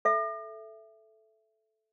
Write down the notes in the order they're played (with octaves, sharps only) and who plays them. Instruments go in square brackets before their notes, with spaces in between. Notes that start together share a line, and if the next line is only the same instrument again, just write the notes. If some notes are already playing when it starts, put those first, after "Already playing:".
[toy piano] A4 E5